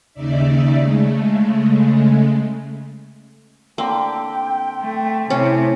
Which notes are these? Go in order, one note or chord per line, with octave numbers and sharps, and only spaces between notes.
D#2 C#3 D#4 D5 E5
C#3 G#3 A3
D3 A#3 C4 G4 G5
A3
A2 C3 C#4